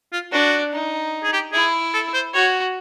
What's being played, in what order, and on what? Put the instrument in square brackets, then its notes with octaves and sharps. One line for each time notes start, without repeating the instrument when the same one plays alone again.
[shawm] F4
[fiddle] D4 [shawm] F#4
[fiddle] D#4
[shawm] G#4
G4
[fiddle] E4 [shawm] G#4
[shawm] A4
C5
[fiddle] F#4 [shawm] C#5